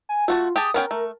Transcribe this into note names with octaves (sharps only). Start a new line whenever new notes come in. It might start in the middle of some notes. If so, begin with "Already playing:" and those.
G#5
A3 F4 F#4 A5
G4 G#4 A5 D#6
B3 C#4 A#4 G5
A3